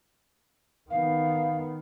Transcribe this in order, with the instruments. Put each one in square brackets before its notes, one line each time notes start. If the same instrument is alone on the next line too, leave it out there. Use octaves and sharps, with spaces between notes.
[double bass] D#3 B3 [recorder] F5